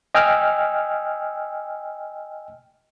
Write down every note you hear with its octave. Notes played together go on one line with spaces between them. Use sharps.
D#5 G5 G#5 E6 F6